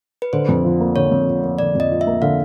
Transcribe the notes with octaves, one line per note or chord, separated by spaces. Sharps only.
B4
D3 C5
F2
F3
A#3
D3 C#5
F2
F3
A#3
D3 D5
F2 D#5
F3
E5
A#3
D3 F5